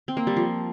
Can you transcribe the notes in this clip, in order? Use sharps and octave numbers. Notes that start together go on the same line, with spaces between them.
C4
A#3
G3
F3